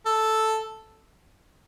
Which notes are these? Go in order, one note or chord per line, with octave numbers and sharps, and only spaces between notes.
A4